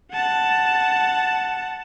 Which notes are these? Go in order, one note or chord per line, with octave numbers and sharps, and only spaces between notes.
F#5 A5